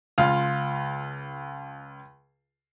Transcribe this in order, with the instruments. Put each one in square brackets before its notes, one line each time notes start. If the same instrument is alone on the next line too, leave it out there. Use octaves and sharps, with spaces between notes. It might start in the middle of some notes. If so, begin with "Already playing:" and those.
[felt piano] C#2 F4 F5